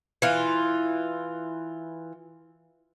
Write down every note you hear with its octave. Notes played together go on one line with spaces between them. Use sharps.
E3 F4